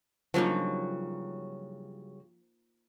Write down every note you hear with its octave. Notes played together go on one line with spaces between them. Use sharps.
G2 C#3 F3 F#3 A#3 D#4